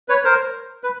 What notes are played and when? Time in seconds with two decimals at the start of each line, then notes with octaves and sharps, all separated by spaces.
0.09 B4 C#5
0.25 A#4 C5
0.84 B4